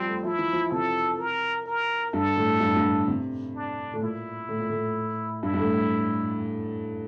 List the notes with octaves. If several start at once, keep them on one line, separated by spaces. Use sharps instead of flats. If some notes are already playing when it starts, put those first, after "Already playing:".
Already playing: F3 G3 C4
A3
F3 E4
E3
F3
C3 A4
A#4
A#4
G2 A4
A2
G2
G2
C3
D4
A2
A#2 E4
A2
A#2
A2
G2 E4
G2
A2